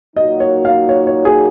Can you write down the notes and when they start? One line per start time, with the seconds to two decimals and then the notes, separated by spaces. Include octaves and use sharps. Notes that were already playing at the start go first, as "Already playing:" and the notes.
0.16 A#2 F#3 A#3 D#4 F#4 D#5
0.40 C#5
0.65 F5
0.89 C#5
1.07 C#5
1.25 G#4